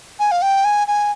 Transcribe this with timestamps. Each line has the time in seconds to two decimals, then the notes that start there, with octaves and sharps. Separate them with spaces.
0.19 G#5
0.31 F5
0.42 G5
0.64 G#5
0.87 G#5